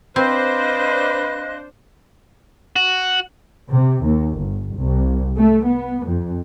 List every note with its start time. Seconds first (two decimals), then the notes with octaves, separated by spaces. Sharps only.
0.16 C4 D4 B4 C5 D#5 F5 F#6
2.76 F#4
3.73 C3
4.04 D#2
4.37 G1
4.77 C2
5.37 A3
5.66 B3
6.05 F2